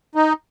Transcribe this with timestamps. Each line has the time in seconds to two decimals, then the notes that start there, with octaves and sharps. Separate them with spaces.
0.15 D#4